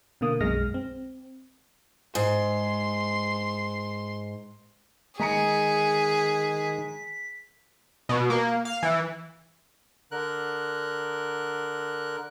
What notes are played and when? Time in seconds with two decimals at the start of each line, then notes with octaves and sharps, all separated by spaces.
0.21 B2 D3 A#3 D#6
0.41 B1 F#2 G#3 F6 A#6
0.74 C4
2.15 G#2 C6
5.19 D#3 G#3 G#4 A#5 B6 C#7
8.09 B2
8.30 A#3
8.65 F5
8.83 E3
10.12 D3 A#4 F#6